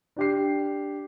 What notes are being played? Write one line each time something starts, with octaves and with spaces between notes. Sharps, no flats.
D4 G4 C7